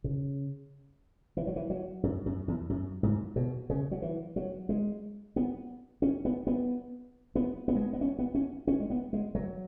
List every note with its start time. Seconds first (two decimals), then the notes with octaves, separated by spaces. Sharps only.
0.04 C#3
1.37 E3
1.47 F#3
1.56 E3
1.70 F#3
2.03 F#2
2.26 F#2
2.48 E2
2.70 F#2
3.03 G#2
3.36 B2
3.70 C#3
3.91 F#3
4.02 E3
4.36 F#3
4.69 G#3
5.36 B3
6.02 C#4
6.25 B3
6.47 B3
7.35 B3
7.68 B3
7.76 G#3
7.82 B3
7.93 B3
8.01 C#4
8.19 B3
8.35 C#4
8.67 C#4
8.80 G#3
8.90 B3
9.13 G#3
9.35 F#3